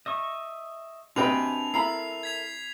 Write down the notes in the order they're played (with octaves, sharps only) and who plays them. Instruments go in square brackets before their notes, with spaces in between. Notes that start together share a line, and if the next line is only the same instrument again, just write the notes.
[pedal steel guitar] D#5 E5 C#6
[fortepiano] C3 B4 G5 [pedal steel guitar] D4 G#5 [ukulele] F#4 D#5 [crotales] F7
[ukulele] E4 A#5 B5 [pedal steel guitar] A4 A#4 E5 [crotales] C7
[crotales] G#6 B6 F7